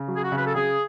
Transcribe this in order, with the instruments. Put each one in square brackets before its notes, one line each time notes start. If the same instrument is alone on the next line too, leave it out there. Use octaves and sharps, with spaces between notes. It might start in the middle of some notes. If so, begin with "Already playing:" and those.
Already playing: [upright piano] C#3
F#3
[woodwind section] G#4
F#4
[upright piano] C#3
[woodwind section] B4
A4
[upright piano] C#3 [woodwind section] G#4